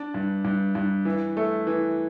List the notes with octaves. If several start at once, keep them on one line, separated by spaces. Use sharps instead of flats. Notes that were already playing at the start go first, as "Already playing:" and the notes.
Already playing: D4
G2
G2
G2
E3
A3
E3